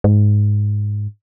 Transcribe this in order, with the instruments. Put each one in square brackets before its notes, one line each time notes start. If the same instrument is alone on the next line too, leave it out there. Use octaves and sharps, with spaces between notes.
[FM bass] G#2